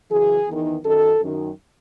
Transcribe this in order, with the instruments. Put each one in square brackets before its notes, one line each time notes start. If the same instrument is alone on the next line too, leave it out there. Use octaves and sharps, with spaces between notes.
[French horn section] F#2 C#3 E3 G#4
E2 D#3
F#2 D#3 A4
F#2 D#3